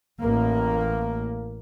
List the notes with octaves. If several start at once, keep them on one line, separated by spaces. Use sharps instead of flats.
A1 A2 A#3